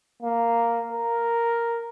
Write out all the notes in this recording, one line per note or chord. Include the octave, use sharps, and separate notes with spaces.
A#3
A#4